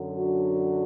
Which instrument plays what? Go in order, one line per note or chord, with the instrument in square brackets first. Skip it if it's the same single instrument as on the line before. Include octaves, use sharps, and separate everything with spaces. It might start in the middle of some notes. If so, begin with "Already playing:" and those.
Already playing: [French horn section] F#2 D3 F#3
D4 F#4